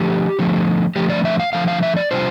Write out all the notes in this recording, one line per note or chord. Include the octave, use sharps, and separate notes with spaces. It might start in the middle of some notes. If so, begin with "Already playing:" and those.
Already playing: D3 F3 A3 G4
D3 F3 A3
D3 F3 A3 G4
D5
E5
F5
D3 F3 A3 F5
F5
E5
D5
C3 G3 D4 F4 C5